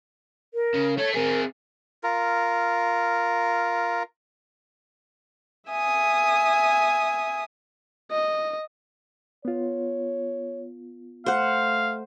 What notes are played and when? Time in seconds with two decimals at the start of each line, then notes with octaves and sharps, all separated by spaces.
0.54 A#4
0.74 C#3
0.98 A3 A4 C#5
1.14 C4 G#4 A#4
2.03 F4 A#4
5.70 E5 G#5 D#6
8.11 D#5
9.45 B3 F4 C#5
11.26 A3 C5 F5 F#5